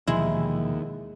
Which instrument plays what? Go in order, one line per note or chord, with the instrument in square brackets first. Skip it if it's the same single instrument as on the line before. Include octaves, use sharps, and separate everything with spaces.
[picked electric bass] D#2 [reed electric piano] B2 E3 F3 [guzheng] G#3 E4